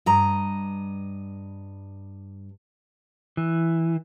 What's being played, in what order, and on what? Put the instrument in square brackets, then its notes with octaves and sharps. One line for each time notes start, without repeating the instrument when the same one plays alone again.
[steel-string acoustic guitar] G2 D#5 A#5
[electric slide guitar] E3